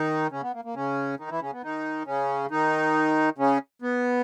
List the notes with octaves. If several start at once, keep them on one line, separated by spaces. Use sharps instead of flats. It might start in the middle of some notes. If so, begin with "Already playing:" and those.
Already playing: D#3 D#4
C#3 C#4
B3
A#3
A#3
C#3 C#4
D#3 D#4
E3 E4
C#3 C#4
B3
D#3 D#4
C#3 C#4
D#3 D#4
C#3 C#4
B3